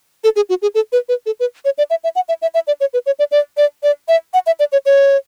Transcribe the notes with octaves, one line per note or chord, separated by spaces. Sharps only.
A4
G#4
F#4
G#4
A4
B4
B4
A4
B4
C#5
D5
E5
E5
F#5
E5
E5
E5
D5
C#5
B4
C#5
D5
D5
D5
D5
E5
F#5
E5
D5
C#5
C#5